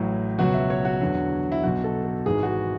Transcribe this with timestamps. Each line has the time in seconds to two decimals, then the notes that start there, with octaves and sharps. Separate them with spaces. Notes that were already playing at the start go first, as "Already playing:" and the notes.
Already playing: A1 A2 F#3
0.38 C#2 B2 F#3 F#4
0.54 E5
0.70 C#5
0.85 F#4
1.01 E2 D3 F#3
1.52 E4
1.63 B1 B2 F#3 F#4
1.84 A4
2.04 A4
2.26 G#1 G#2 E3 G#4
2.43 F#4
2.46 G#4